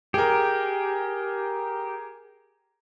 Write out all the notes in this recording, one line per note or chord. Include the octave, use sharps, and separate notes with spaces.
G4 G#4 A#4